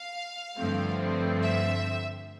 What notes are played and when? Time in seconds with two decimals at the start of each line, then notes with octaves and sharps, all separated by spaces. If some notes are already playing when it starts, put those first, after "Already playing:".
Already playing: F5
0.57 G2 D3 F3 A3 C4
1.43 E5